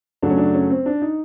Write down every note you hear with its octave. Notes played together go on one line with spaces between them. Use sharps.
F#2 C#3 F#3 A3 D4
C#4
D4
C#4
C4
D4
D#4